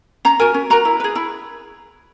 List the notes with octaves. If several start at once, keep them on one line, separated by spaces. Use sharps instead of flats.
C#4 A#5
F#4 A#4 G#5
C#4
F#4 A#4 A#5
E4
B4
G#4
E4 B5